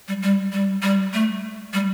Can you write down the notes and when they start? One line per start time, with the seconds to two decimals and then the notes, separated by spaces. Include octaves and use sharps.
0.08 G3
0.22 G3
0.52 G3
0.82 G3
1.13 A3
1.73 G3